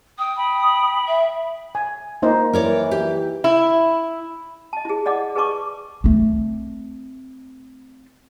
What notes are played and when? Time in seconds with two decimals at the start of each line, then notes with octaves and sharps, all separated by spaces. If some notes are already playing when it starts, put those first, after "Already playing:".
0.18 G5 D#6
0.36 G5 B5
1.07 E5
1.75 G#5
2.22 A#3 D#4 C5
2.53 E3 A#4 C#5 D5
2.91 G4
3.44 E4
4.73 D#5 A5
4.85 E4 G#4
5.06 D5 D#5 F#5 D6
5.35 G#4 B4 D#5 A5 C#6 D6
6.04 A3 C4